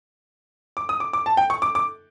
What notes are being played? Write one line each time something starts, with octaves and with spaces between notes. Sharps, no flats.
D6
D#6
D6
D6
A5
G5
C#6
D6
D6